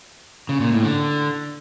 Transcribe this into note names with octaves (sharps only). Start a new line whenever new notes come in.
C#3
A#2
A2
D3